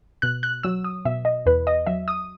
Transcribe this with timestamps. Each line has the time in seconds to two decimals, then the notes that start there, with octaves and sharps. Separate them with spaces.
0.22 B2 F#6
0.43 F#6
0.63 F#3 E6
0.84 D#6
1.05 B2 E5
1.25 D#5
1.46 E2 B4
1.67 D#5
1.87 F#3 E5
2.08 D#6